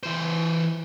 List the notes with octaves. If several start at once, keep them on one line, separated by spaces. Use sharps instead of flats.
E3 C5